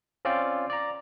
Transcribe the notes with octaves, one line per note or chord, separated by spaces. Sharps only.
C4 C#4 F4 D5 F5 G5
D5 A#5